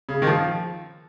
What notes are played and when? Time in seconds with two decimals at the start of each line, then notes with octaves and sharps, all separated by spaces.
0.09 C#3
0.22 D#3
0.27 F3